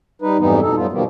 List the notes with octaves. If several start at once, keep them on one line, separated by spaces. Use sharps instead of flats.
G3 D#4 B4
F2 G#2 E3 G3 B3 D#4
B2 D#4 A4
F#2 A2 G3 B3 F4
B2 D#3 F3 G3 A#3 B3